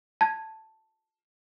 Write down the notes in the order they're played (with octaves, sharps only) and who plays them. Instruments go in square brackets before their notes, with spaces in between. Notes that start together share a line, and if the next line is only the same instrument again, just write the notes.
[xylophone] A5 G#6